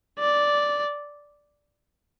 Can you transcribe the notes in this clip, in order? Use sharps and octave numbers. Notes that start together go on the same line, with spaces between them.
D5